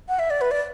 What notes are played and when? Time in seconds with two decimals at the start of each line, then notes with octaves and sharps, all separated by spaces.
0.09 F#5
0.19 E5
0.30 D5
0.41 B4
0.51 D5